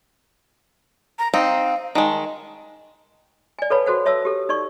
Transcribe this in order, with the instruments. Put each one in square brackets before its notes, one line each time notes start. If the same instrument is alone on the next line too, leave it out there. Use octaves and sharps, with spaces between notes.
[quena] A#5
[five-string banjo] C4 D#4 [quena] F5
[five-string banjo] D#3 G#3 [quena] A5
[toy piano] D5 G#5
A4 B4 C#5 F5 A5 B5
F#4 A4 C5 F#5
C#5 E5 A5 E6
G4 A4
D#4 D5 C#6